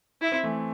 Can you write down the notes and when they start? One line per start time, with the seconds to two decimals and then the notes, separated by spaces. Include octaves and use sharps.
0.22 E4
0.32 C4
0.44 E3 A3